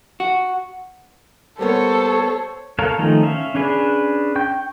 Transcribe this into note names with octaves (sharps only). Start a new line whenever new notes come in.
F#4
G3 A#3 B3 A4 C5 C#5
A4 A#4 C#5 F5
D#3 F3 A3 C#4 D#4
C#4 E5 F5
C#4 D4 G#4 B4
G5 C#6 G6